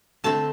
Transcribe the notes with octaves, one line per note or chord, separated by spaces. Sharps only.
D3 A3 C4 A5